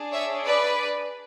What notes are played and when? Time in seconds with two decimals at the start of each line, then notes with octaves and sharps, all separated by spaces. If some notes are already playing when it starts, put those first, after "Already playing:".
Already playing: D4 G#4
0.12 C#5 E5
0.45 B4 D5